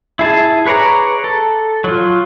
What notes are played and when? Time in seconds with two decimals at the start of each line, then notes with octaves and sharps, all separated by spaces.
0.19 E4 G#4 A5
0.66 G#4 B4 C#5 D5 A#5
1.24 A4
1.84 F#3 F4